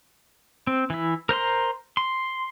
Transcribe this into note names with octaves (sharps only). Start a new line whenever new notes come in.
C4
E3 E4
A#4 C5 A#5 C6
C6